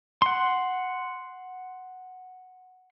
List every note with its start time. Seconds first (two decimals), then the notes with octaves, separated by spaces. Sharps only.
0.22 F#5 C6